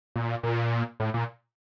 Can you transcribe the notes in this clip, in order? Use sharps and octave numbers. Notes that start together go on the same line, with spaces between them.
A#2
A#2
A2
A#2